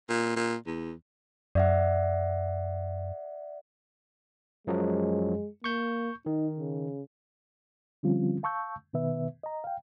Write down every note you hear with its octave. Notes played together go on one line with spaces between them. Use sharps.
A#2
A#2
E2
F#2 D5 E5 F#5
F#2 F3 F#3 G#3
A#3 C#6 G6
D#3 D#4
C#3
D3 F3 G3 C4 C#4 F4
F5 A5 C#6 E6 G6
B2 D#3 B3 B4 E5
D#5 A#5
F5 G5